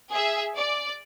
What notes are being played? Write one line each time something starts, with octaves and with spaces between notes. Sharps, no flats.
G#4 E5
D5